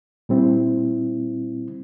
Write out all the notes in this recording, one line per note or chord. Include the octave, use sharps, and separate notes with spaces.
A#2 G3 C4 E4